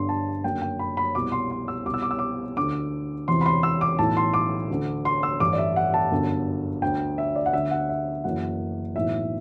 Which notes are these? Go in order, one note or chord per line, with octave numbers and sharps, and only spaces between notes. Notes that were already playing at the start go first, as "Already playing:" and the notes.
Already playing: G1 G2 D3 C6
A5
F#1 F#2 D3 G5
G5
B5
B5
C2 B2 D6
C6
C6
E6
C2 B2 D6
E6
D6
E6
D6
D2 D3 D6
E1 E2 C3 E3 C6
B5
C6
E6
D6
B1 A2 E3 A5
C6
D6
D2 D3
C6
E6
A1 G2 D3 D6
D5
E5
F#5
A5
G1 F#2 D3
D2 D3 G5
E5
D5
F#5
D2 D3 E5
F#5
E5
F#1 F#2 E3 F#5
B1 A2 E3 E5